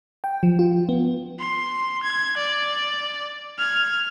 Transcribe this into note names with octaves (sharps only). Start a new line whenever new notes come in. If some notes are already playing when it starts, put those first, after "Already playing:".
G5
F3
F4
B3
C6
G#6
D5
F6 G#6